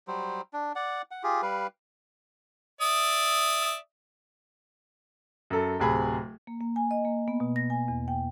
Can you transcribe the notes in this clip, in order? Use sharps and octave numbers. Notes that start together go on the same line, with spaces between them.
F#3 G3 C5
D4
D5 F#5
F#5
F4 G4 G#4
G3 B4 F5
D5 E5 D#6
F#2 A4
D1 C3 G#4 B5
A#3
A#3
G#5
D#5
A#3
B3
B2
A#6
G#5
E2
G5